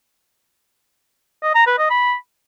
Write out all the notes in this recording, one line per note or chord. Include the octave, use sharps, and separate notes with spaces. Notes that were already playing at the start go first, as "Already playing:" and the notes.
D#5
A#5
B4
D#5
B5